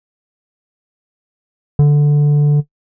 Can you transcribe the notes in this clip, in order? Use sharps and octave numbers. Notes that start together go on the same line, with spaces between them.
D3